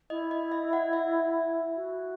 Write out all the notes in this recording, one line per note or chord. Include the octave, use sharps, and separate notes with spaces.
E4 D#5
D#5
E5
F#5
E5
F#4